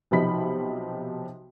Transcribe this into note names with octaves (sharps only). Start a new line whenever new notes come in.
B1 C3 F3 D#4 B5 B6